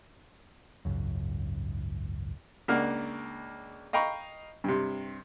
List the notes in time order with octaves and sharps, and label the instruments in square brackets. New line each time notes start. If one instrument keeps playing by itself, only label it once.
[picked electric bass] G#1 C#2 F#2
[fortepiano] C#2 A#3 D4 F#5 F6
D#5 F5 G5 A#5 B5 C#6
G2 C3